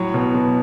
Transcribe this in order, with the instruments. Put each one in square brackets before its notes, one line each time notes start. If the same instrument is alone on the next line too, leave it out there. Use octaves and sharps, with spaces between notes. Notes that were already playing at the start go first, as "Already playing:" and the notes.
Already playing: [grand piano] A2 F#3 C#5
B2
B2